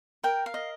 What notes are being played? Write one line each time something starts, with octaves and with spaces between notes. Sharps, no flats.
A#4 G5
F5
D#5